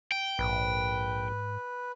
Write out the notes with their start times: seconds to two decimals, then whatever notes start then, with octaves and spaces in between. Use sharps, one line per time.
0.12 G5
0.39 A#1 G#2 B4